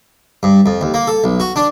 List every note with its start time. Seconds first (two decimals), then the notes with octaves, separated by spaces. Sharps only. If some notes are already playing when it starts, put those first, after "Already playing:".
0.43 G2
0.66 F2
0.81 D#2
0.94 A#3
1.07 A4
1.24 B1
1.40 F#4
1.56 D4